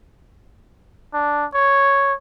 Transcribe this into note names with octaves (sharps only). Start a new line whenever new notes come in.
D4
C#5